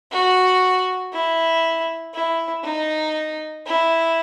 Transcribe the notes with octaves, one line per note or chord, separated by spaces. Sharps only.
F#4
E4
E4
D#4
E4